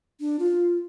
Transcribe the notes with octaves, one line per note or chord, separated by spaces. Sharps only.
D4
F4